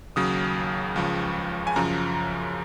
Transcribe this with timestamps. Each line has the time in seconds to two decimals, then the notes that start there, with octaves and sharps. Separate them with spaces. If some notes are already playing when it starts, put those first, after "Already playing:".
0.16 D#2 C#3 F#3 D#6
0.96 C#2 C#3 F3
1.67 G#5
1.76 F#2 C#3 F3 A#5